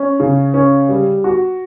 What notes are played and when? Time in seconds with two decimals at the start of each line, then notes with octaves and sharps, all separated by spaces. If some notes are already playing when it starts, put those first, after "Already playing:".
Already playing: C#4
0.20 C#3
0.54 C#4
0.89 G3
1.24 F#4